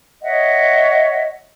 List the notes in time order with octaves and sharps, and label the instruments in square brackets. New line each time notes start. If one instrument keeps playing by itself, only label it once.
[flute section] C#5 D#5 E5 F#5